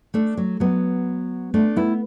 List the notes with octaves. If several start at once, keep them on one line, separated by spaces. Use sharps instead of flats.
A3 D4
F#3
F#3 B3
A3 D4
B3 E4